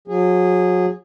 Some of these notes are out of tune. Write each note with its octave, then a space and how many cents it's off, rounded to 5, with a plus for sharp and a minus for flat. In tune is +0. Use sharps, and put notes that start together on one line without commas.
F#3 -35 G#4 -20